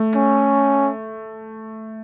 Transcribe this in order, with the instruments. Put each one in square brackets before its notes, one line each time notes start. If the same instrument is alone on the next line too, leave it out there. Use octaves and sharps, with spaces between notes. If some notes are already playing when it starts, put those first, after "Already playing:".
Already playing: [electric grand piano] A3
[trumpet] C#4